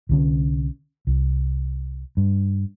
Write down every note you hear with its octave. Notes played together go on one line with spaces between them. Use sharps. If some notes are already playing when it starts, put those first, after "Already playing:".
C2 D3 C#4
C2
G2